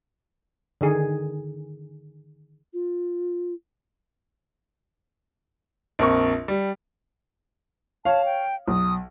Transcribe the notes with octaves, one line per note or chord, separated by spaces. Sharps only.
D3 D#3 G#4
F4
A#1 F2 A#4 C#6
G3
C#5 F5 A5
G5
B1 D#6